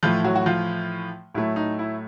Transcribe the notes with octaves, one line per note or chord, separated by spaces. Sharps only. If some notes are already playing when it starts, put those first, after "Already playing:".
A2 E3 F3 A3 F4
F#3 F#4
F#4
F3 F4
A2 F#3 A3 E4
D#4
E4